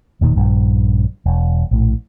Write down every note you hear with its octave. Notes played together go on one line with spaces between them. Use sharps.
E1 A#2 D3 D#3
A#1 G2
E1
A#1 A2